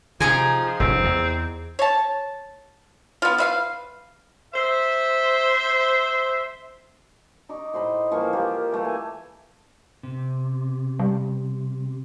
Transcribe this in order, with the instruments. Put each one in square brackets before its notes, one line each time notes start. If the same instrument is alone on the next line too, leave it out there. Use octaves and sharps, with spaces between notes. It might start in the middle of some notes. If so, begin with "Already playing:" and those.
[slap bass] C3 [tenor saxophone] F3 [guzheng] D#4 G#4 G#5
[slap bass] F1 F#2 [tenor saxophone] C4
[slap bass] E2
[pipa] C#5 A5
B3 F4
B4 E5 F5
[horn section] C5 E5
[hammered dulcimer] D#4 C#6 D6
A2 C5 D#5 B5
E3 F3 A#3 C#6
A#3 F4 G4
E3 A3 A#3 A4
G#5
[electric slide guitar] C3
[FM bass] G3